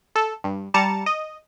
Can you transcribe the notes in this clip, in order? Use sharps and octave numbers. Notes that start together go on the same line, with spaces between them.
A4
G2
G3 A5 A#5 A6 C#7
D#5